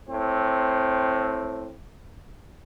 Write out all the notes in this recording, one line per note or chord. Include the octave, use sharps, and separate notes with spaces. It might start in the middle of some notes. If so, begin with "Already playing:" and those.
A2 C4